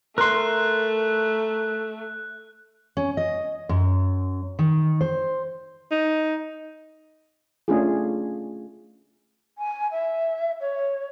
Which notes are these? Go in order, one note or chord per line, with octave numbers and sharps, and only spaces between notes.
A3 A#4 C6 F#6
C#4
D#5
F#2
D#3
C5
D#4
A3 C#4 D4 F4 G#4
G#5
E5
C#5